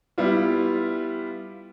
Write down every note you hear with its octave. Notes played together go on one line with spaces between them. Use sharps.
G3 B3 E4 F4